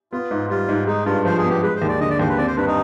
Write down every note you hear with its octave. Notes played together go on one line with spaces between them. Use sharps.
B3 F4
G#2
G3 F4
G#2
G#3 D#4
G2 F4
F3 C5
G#4
B3
G4
G#3 B4
C5
D#2
D5
D3 D#5
D5
D#2 C5
B4
C4 D5
C5
G2 B4
D#4